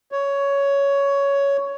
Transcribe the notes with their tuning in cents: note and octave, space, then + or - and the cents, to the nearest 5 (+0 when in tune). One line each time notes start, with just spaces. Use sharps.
C#5 +10